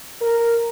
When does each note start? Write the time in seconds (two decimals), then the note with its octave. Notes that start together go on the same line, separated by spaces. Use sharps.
0.21 A#4